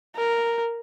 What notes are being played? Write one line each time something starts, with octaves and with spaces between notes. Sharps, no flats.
A#4